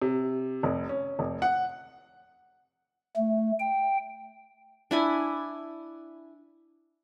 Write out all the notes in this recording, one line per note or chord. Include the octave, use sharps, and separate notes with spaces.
C3
F1
C#4
F1
F#5
A3
G5
D4 E4 G#5